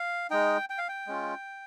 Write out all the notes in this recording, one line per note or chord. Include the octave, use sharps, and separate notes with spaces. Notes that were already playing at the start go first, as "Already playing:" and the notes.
Already playing: F5
G#3 D#4 G5
G5
F5
G5
G#3 C#4 F4